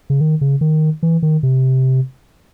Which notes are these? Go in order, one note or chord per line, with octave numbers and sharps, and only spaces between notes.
C#3
D#3
C#3
D#3
E3
D#3
C3